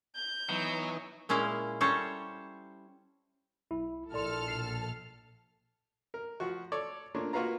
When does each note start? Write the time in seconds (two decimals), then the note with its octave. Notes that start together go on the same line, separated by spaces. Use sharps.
0.16 G6
0.49 E3 F#3 B3 D#4
1.29 A#2 G#3 C#4 E4 F5
1.81 G3 C#4 A4 C5 C#5
3.71 B1 E4
4.13 A#1 E4 A4 D5 C6 F6
4.48 B1 B2 C7
6.14 A#4
6.40 F3 F#4
6.72 A4 C#5 D5
7.15 A3 A#3 D4 F4 C#5
7.33 A#3 F4 F#4 B4 F5 A#5